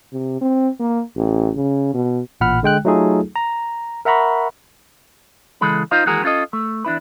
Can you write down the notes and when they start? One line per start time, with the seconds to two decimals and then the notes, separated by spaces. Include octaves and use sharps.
0.12 C3
0.41 C4
0.80 A#3
1.16 A1
1.56 C#3
1.94 B2
2.41 A1 A#2 F#5 B5 F6
2.63 D3 G#3 G5 F#6
2.85 F#3 A3 D#4 F4 G#4 A4
3.36 A#5
4.05 A#4 E5 F#5 A#5 B5 C#6
5.61 C#2 E3 G#3 A4 B5
5.91 D#4 F4 C5 D#5 F5
6.06 D#2 E3 G#3 F#4 G#4 A#4
6.23 B3 C#4 F4 A4 D#5
6.53 A3
6.85 E2 D4 E4 B4